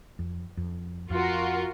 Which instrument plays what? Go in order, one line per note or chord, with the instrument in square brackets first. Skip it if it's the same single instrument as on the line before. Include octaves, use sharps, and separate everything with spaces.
[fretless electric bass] F2
F2
[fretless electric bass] F2 [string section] F4 F#4 A#4